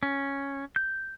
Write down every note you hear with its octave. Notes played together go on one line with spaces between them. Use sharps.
C#4
G6